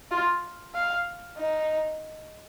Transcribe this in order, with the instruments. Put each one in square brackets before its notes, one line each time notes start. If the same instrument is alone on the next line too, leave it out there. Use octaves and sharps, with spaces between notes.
[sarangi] F4
F5
D#4